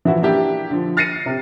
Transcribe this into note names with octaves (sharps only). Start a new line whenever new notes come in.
E3 F3 E4 F#4
A#3 D4 E4 G4
D3 F3
F6 A6 A#6 C7 C#7 D#7
C3